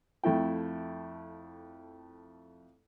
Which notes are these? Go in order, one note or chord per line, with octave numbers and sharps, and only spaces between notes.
F2 A3 E4 G5